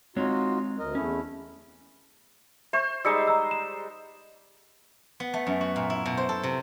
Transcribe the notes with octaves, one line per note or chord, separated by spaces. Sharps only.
G#3 C4 D#4 F4 F#4 C#5
D2 A#4 D#5
E2 A3 C#4 E4
C5 E5 C#6
G3 G#3 D#4 E6 C#7
A#5 E6
E7
B3
A3
F#2
F#4
A#2
E4
B2
C5
A4
C3